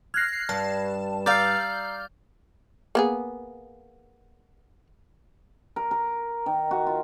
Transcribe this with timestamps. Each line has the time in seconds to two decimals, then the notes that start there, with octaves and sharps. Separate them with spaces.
0.14 F6 F#6 G#6 A#6 C7
0.49 G2 A5
1.26 D5 F5 A#5 E6 F6 G6 C7
2.95 A#3 B3 G#4
5.76 A#4
5.91 A#4
6.46 D#3
6.71 F#4
6.87 F4